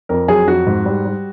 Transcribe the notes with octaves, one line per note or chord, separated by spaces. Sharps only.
F2 A#4
F#3 G#4
F2 F#4
G#2
G3
G3